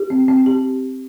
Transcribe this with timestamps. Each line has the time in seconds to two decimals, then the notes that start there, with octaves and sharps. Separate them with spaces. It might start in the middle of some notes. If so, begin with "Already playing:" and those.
Already playing: G4
0.10 C4
0.28 C4
0.46 G4